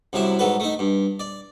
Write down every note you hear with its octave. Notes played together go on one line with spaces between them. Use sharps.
C2 F#2 C3 E4 E5
G#2 F#3 A4 B4
A3 D#4
G2
D5